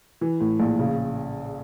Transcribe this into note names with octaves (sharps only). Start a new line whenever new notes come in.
E3
A2
A#1
C#3